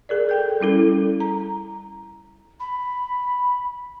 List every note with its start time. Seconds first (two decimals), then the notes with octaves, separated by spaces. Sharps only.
0.09 G#4 A#4 D5
0.29 A4 G5 G6
0.60 G3 C#4 E4 A4
1.20 A#5
2.60 B5